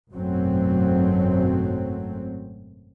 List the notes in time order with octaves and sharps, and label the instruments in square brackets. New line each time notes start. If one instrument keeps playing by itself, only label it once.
[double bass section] G#1 F#2 B2 F#3 A3 C4